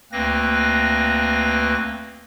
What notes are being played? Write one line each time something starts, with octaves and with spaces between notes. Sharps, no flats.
D2 A#3 C4 B4 A#6